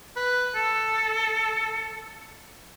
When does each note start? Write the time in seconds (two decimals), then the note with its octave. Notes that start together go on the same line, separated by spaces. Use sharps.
0.16 B4
0.55 A4